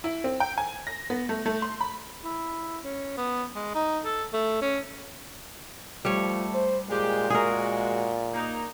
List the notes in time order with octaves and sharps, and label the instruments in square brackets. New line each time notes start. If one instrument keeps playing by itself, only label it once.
[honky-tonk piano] E4
C4
G5
G#5
A#6
B3
A3
A3
C6
B5
[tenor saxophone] E4
C#4
B3
G#3
D#4
A4
A3
C#4
[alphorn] F3 [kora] G3 C#5 [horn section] A3
[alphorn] C5
[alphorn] A#2 [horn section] G#3 G4
[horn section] G#3 F#4 [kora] G#4 A#4
[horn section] A#3 D#4